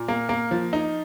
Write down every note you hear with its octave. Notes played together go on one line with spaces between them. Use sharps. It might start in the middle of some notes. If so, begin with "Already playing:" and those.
Already playing: A#2
A#3
A#3
F3
D#4